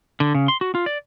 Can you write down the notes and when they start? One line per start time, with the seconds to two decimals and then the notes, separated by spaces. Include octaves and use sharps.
0.20 D3
0.34 C#3
0.48 C6
0.61 F#4
0.75 F4
0.86 D5